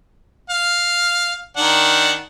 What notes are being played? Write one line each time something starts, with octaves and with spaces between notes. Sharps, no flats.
F5
D#3 D4 F#5